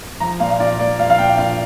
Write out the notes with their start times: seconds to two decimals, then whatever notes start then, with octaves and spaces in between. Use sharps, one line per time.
0.20 F3 A#5
0.40 A#2 F5
0.51 F5
0.60 F4 D5
0.79 A#3 D5
0.99 F3 F5
1.10 F5
1.18 A#2 G5
1.38 F4 F5